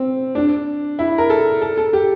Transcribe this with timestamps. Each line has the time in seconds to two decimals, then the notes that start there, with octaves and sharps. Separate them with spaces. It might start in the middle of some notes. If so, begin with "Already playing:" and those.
Already playing: C4
0.35 D4
0.99 E4
1.18 A#4
1.30 A4
1.61 A4
1.77 A4
1.93 G4